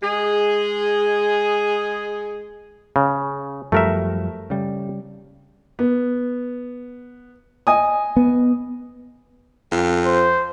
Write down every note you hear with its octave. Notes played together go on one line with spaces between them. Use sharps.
G#3 G#4
C#3
F#2 F3 G3 A3 A#4 E5
C#3 G3
B3
D#5 G#5 D#6
B3
F2
C5